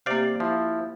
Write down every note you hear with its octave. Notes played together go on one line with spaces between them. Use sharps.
C3 A#3 G4 D5 F5
F3 E4